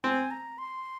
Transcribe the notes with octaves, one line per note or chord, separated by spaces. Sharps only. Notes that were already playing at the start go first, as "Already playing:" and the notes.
C4 G#5
A#5
C6